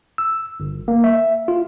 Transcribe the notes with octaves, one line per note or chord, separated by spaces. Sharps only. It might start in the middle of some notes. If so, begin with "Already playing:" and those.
E6
G1
A#3
E5
F4